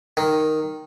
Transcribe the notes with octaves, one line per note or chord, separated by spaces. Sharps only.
D#3